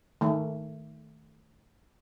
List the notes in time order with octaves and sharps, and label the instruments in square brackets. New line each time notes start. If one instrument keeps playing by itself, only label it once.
[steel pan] D#3 A3